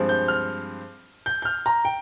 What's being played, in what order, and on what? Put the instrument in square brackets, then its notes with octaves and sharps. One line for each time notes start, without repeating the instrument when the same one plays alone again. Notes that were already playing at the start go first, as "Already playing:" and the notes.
Already playing: [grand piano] G2 F3 G#3 C4
G6
F6
G6
G6
F6
A#5
G5